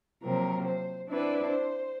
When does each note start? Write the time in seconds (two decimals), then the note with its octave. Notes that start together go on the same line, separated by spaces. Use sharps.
0.23 C3 F3 F#3 A#3 C4 A#4
0.65 C5
1.08 C4 D4 E4 B4 D5
1.49 C5